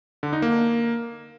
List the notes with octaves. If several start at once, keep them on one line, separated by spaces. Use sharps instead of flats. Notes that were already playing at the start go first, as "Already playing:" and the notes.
D3
D#4
A#3